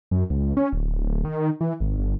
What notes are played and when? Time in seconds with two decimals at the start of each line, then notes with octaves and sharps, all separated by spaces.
0.11 F#2
0.30 C#2
0.57 C#4
0.72 D1
1.25 D#3
1.61 E3
1.80 G#1
1.98 G1